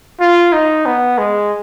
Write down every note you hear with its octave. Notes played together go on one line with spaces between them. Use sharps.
F4
D#4
B3
G#3